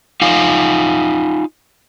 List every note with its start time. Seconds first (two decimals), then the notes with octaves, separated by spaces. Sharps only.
0.22 D#4 F4 F5 G#5